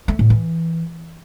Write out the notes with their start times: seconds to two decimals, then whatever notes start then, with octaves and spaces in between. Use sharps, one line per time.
0.08 A3
0.19 A2
0.30 E3